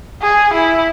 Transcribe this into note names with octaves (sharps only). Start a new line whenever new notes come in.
G#4
E4